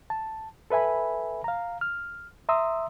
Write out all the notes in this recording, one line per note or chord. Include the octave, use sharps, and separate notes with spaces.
A5
A4 B4 E5 G#5 B5
F5 A#5
F6
E5 A#5 C6 D#6 E6